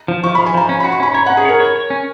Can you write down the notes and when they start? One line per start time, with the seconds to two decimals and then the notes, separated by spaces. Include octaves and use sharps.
0.08 F3
0.23 F3 C#6
0.35 B5
0.38 F3
0.46 G#5
0.54 F3 A#5
0.69 C#4
0.80 B5
0.84 F#4
0.92 C#6
1.00 C#4 B5
1.14 C#5 A#5
1.26 F#5
1.30 C#4
1.37 G#4
1.45 A#4 C#5
1.60 C#5
1.76 C#5
1.90 C#4